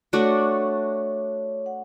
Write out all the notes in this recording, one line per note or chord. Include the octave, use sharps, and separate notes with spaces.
A3 D4 F#4 C#5
F#5